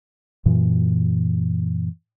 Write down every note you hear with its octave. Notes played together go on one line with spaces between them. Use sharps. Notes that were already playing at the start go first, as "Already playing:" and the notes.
F#2 A#2 E3